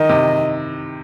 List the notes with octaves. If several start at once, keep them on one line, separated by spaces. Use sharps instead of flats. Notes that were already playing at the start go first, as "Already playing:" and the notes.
Already playing: D#3 D#5
C3